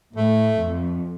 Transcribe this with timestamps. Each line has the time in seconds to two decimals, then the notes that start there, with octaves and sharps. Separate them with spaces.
0.16 A2 A3
0.59 F2